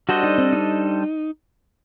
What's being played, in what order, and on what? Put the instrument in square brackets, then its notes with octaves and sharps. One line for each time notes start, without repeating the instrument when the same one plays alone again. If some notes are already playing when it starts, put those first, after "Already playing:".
[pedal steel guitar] G3 D4 A4 C5 D#5 [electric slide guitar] F#4
[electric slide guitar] D#4
C4
D#4